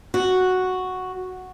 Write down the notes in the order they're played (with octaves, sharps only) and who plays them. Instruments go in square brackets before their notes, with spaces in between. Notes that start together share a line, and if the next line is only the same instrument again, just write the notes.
[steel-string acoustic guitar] F#4